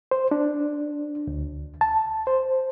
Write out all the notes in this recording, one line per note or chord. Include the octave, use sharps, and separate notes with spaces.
C5
D4
D2
A5
C5